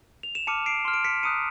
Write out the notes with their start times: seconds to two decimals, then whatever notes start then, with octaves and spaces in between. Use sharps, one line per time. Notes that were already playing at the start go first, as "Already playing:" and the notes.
0.23 F7
0.35 E7
0.47 A5 D6 F6 C#7 D#7
0.66 C7 D7
0.85 C6 F6
0.94 D7
1.04 B6 C#7
1.23 A#5 D#6 F#6 C#7 D#7